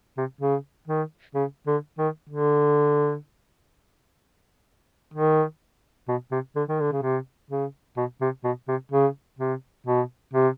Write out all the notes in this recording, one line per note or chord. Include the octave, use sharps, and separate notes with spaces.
C3
C#3
D#3
C#3
D3
D#3
D3
D#3
B2
C3
D3
D#3
D3
C#3
C3
C#3
B2
C3
B2
C3
C#3
C3
B2
C3